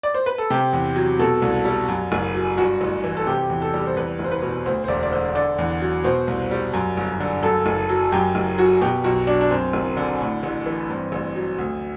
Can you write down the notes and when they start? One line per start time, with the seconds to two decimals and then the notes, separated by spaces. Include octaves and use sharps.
0.03 D5
0.15 C5
0.26 B4
0.38 A4
0.50 C3 G4
0.73 E2
0.96 F#3
1.19 B2 A4
1.42 C2
1.65 G3
1.88 F#2
2.12 F#1
2.35 F#3
2.58 G2 F#4
2.81 A1
3.04 E3
3.17 A4
3.27 C3 G4
3.50 E2
3.62 A4
3.73 G3
3.87 C5
3.97 E2 B4
4.19 F#1
4.24 C5
4.31 B4
4.42 B2
4.66 D2 C5
4.84 C5
4.88 E1 D5
5.03 D5
5.11 D3 C5
5.35 D3 D5
5.58 E2
5.81 F#3
6.04 B2 C5
6.27 C2
6.51 G3
6.73 F#2
6.97 G1
7.20 D3
7.43 F#2 A4
7.66 F#1
7.89 F#3
8.12 F#2 G4
8.35 F#1
8.58 F#3 F#4
8.81 B2 G4
9.04 B1 F#4
9.27 F#3 D4
9.41 D4
9.50 F#2 C4
9.73 F#1
9.97 D3
10.21 A2
10.43 A1
10.66 E3
10.89 G2 C4
11.12 A1
11.35 F#3
11.58 D2